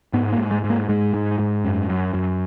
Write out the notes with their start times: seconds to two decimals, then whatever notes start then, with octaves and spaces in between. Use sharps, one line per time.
0.13 G#2 B3
0.32 A#3
0.38 G#2
0.51 G#3
0.64 G#2
0.70 A#3
0.89 G#2 G#3
1.14 G#2
1.39 G#2
1.64 F#2
1.89 F#2
2.14 F#2